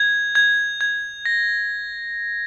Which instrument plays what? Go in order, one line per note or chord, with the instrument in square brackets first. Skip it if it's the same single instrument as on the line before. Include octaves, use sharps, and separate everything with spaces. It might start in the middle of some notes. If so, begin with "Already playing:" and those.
Already playing: [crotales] G#6
G#6
G#6
A#6